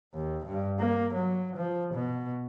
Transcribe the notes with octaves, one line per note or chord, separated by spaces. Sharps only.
D#2
G2
A#3
F#3
F3
B2